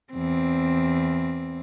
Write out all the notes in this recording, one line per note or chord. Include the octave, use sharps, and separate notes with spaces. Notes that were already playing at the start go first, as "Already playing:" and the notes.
E2 C4